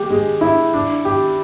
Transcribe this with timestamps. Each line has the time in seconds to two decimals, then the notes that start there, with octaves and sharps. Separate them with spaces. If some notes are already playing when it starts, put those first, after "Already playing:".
Already playing: G#3 G4
0.10 G#3
0.41 E4
0.73 D4
1.05 G4